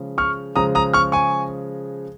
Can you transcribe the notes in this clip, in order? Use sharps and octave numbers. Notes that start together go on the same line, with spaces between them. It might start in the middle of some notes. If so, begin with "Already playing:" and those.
Already playing: C#3 F3 G#3
C#6 F6
C#3 F3 G#3 A#5 D#6
A#5 D#6
C#6 F6
G#5 C#6